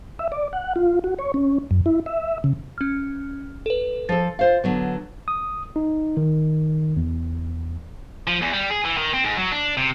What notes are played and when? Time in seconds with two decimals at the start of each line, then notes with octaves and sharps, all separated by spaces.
0.19 E5
0.32 D5
0.53 F#5
0.76 F4
1.04 F#4
1.19 C#5
1.34 C#4
1.71 F#2
1.86 E4
2.06 E5
2.44 C#3
2.78 C#4 F6
3.66 A4 B4
4.09 F3 A4 A6
4.39 F4 C5 F5
4.64 D3 F#3 B3
5.28 D#6
5.76 D#4
6.17 D#3
6.97 E2
8.27 F3
8.41 E2
8.53 G3
8.70 G#4
8.85 E3
8.97 D#3
9.13 C4
9.25 G#2
9.37 F#3
9.51 D4
9.77 C3